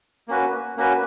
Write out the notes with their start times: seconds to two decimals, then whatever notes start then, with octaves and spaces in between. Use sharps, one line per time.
0.28 A#3 C#4 F#4 B4
0.77 A#3 C#4 F#4 B4